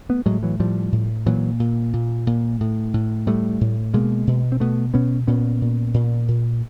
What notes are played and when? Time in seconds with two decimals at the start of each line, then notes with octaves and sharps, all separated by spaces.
0.09 A3 B3
0.26 A2 F#3 G#3
0.43 E3 F#3
0.60 A2 F3 G3
0.92 A2
1.26 A#2 E3 F#3
1.60 A#2
1.93 A#2
2.27 A#2
2.61 A2
2.94 A2
3.27 A2 G3 A3
3.61 A2
3.94 B2 G#3 A#3
4.27 B2
4.52 C4
4.60 B2 A3 B3
4.94 B2 B3 C#4
5.27 A#2 B3 C#4
5.61 A#2
5.94 A#2
6.28 A#2